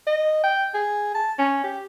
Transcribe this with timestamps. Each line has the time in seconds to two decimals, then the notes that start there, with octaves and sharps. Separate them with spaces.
0.07 D#5
0.43 G5
0.74 G#4
1.14 A5
1.38 C#4
1.63 G4